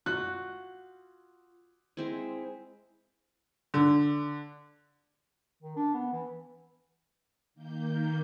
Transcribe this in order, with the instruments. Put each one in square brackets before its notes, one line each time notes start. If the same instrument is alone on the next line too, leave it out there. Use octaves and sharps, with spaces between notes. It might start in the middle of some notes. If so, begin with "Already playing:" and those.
[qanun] F4 F#4 [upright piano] F#6
[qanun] G#3 C4 E4
[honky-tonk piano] D3
[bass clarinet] D#3
D4
B3
E3
[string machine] D#3 A#3 G6